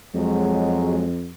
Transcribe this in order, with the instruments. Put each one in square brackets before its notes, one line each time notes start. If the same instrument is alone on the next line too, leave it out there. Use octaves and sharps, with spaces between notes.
[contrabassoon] F2 [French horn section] F#3 G#3